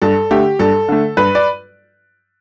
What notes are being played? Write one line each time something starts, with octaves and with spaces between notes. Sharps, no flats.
G2 A4
D3 A3 G4
G2 A4
D3 A3
G2 B4
D5